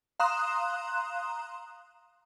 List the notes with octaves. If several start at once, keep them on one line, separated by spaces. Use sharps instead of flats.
F5 A#5 C6 D#6 F#6 E7